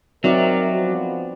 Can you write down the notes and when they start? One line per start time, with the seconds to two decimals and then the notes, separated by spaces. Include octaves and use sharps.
0.24 F#3 C4 D#4 A#4 D5 E5
0.75 F3 B3 F#4